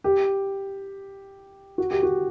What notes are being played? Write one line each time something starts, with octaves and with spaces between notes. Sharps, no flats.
G4
F#4
G4
F#4